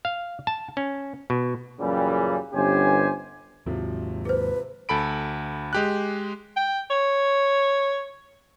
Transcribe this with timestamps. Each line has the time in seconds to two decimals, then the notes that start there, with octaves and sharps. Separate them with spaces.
0.05 F5
0.47 A5
0.77 C#4
1.30 B2
1.80 F#2 A#2 C#3 E3 G3
2.53 G1 B3 C#4 G4 C5 G#5
3.66 D#2 G#2 C3 F3 F#3
4.25 G#4 B4 C5
4.89 D2 A4 B5 D7
5.73 G#3 G4 F#6
6.57 G5
6.90 C#5